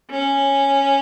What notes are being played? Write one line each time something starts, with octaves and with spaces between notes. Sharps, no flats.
C#4